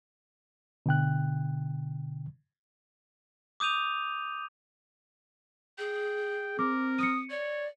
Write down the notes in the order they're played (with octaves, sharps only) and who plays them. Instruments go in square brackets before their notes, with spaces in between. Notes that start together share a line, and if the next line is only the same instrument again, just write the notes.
[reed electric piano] B2 D3 G5 F#6
[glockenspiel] D6 D#6 G6 D#7 F7
[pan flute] G#4 [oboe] G5
[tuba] C4 [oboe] A#4 [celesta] D6
[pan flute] D#6 [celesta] C#7 D#7
[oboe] C#5 [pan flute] D5